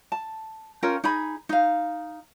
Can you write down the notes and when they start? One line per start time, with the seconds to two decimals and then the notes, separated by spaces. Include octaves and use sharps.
0.12 A5
0.83 C#4 F4 A#4 G5
1.04 D#4 G#4 B5
1.49 D#4 F5